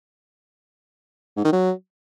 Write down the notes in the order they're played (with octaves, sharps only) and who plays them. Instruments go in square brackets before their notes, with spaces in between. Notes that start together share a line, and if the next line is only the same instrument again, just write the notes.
[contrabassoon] G#2
D#3
F#3